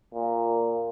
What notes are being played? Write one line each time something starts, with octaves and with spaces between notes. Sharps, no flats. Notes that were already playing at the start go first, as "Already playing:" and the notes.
A#2